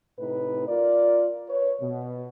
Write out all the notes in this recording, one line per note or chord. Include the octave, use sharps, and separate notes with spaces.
A2 C3 D#4 B4
F4 A#4 D5
B4 C#5
B2